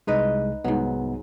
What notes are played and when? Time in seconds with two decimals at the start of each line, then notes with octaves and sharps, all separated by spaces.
0.07 C2 G#3 D#4 B4 D#5
0.64 C2 G#2 F#3 B3